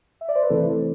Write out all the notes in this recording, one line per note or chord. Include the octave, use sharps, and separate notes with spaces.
E5
D5
C5
B4
C3 E3 A3 C4 E4 A4